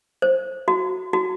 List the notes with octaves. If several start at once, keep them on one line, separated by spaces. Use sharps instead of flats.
C5
F#4
F#4